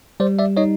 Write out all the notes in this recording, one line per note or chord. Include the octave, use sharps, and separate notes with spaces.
G3 C5 D5
D5 E5
D#4 C#5 D#5